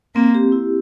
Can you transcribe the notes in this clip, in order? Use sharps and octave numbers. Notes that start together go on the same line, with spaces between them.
A#3 C4
G4
E4